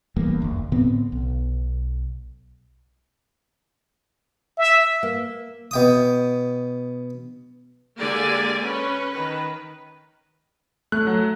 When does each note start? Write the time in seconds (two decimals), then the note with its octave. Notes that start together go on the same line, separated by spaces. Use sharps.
0.16 D#1 E2 G2 A#3
0.42 F#1 D2
0.72 A2 D3 B3 C4
1.12 B1
4.58 E5
5.03 A#3
5.71 B2 G5 D#6
7.97 D3 G#3 A#3 G4 D5 G#5
8.63 C#4 B4
9.13 D#3 B4
10.92 A3 F#6
11.07 F#3